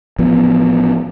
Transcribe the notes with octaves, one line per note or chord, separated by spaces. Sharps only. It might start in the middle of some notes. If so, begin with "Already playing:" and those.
A1 F3 B3